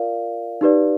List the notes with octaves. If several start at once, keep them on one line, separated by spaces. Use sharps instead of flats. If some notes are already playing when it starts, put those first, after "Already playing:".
Already playing: F4 A#4 D5 F5
D#4 G4 B4 D5